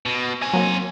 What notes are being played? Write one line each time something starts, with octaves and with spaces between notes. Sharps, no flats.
B2
C4 G#5
F#3 A#3